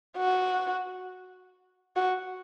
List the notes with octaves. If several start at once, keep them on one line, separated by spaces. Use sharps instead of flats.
F#4
F#4